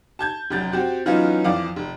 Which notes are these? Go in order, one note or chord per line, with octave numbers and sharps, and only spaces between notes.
A5 G6 G#6
F1 F#2 G6 A6
C4 F#4 G4
E3 F#3 B3 C#4 D#4 F4
F2 E3 D5 F5 D6
F1